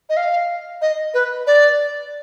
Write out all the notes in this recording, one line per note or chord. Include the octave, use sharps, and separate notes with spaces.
D#5
F5
D#5
B4
D5